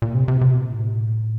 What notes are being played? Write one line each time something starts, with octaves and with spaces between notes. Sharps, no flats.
A#2
C3
C3
C3
B2
A#2
A2